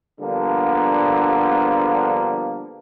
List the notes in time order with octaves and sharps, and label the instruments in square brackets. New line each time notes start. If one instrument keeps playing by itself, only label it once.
[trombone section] D3 F3 G3 A#3 B3 D4